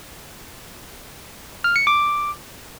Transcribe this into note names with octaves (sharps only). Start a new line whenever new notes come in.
F6
C#7
D6